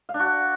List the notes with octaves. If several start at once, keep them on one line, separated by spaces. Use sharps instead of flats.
F5
D4
F#4
D5